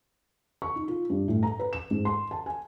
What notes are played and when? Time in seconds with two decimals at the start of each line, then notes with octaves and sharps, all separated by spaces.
0.62 C#6
0.76 D#4
0.88 F4
1.10 G2
1.28 A2
1.43 A#5
1.60 B4
1.73 E7
1.91 G#2
2.05 C6
2.31 A5
2.46 G#5